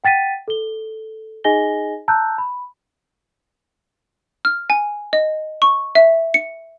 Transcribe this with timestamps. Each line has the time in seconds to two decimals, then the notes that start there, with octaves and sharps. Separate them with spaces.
0.04 F#5 G5 A6 B6 D#7
0.48 A4 G7
1.44 D#4 G#4 D#5 G#5 A#6 G7
2.08 A5 A#5 E6 F#6 G6
2.38 B5
4.45 F6
4.70 G#5
5.13 D#5
5.62 C#6
5.95 E5
6.34 C#7